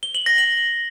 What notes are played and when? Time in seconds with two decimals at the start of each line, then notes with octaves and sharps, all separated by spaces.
0.03 G7
0.15 F#7
0.26 A#6
0.38 F#7